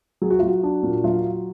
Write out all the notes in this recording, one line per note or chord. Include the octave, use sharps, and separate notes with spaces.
F#3 G#4
F#4
F4
F#3 F#4
D4
A#2
F#3 F4